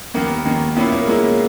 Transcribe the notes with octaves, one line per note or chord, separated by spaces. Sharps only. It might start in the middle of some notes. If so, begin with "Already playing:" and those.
D#2 D#3 A#3 B3
D#2 D#3 A#3
A#2 A#3 B3 C#4 E4
A#3
A#2 G#3 A#3 C#4 E4